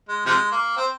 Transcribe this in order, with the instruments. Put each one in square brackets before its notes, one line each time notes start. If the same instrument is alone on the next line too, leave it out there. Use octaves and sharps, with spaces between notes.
[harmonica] G#3
C3 F3 G#3
A#3
C4